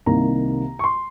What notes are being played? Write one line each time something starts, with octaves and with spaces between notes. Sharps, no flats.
C2 C3 D#3 A#3 A#5
C#6
C6